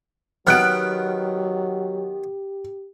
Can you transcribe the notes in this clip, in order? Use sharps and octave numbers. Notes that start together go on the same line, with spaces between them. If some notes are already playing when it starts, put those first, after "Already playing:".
D#3 F#3 B3 G4 F6 F#6 D7